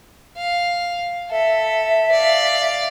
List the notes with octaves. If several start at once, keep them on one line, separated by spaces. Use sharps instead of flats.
F5
A4 E5
D5 F5